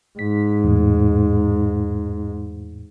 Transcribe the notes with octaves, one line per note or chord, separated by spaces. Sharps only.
G#2 B6
E2 A2